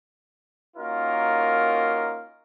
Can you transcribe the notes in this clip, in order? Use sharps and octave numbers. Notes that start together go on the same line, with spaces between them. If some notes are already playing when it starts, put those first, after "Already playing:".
A#3 C#4 D#4 F4 F#4 A#4